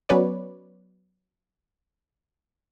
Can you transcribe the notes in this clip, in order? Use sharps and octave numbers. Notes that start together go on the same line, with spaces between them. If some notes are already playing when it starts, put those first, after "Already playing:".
F#3 B3 C#4 B4 C#5 D5